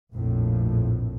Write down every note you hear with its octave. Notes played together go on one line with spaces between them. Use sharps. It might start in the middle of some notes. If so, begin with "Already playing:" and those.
A#1 F2 A2